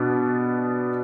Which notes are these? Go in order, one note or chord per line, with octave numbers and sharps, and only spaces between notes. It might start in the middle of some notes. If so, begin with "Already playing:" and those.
Already playing: B2 B3 D4